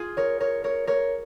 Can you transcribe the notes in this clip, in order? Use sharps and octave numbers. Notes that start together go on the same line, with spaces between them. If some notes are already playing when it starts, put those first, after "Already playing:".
Already playing: F4 G#4
A#4 C#5
A#4 C#5
A#4 C#5
A#4 C#5